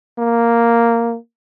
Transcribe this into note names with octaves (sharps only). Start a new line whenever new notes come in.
A#3